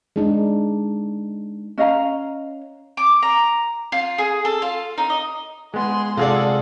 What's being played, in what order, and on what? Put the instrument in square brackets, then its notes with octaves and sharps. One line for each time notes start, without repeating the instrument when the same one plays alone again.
[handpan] G#3 D4 D#4
[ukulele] C#4 D#5 F5 A#5
[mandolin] D6
A#5
F4
G#4
A4
F4
D#4
D#5
[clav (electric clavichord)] G#3 B3 [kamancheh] G#4 C6
[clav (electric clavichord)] C3 G#3 [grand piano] F4 G#4 D5 [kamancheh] A4 F#5